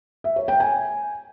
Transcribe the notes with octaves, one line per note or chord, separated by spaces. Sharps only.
E5
C#5
G5
G#5